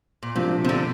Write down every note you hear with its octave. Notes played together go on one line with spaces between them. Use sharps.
A#2
G2 C3 F3 A#3 F4
C3
D3